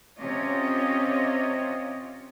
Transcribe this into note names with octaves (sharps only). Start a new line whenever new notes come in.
C3 C#4 F4 C#5 D#5